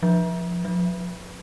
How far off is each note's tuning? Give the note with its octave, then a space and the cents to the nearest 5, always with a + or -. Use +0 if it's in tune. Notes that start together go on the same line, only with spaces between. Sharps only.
F3 +10
F3 +45